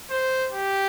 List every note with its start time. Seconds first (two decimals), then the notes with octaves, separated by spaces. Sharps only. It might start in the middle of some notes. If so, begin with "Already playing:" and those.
0.10 C5
0.52 G4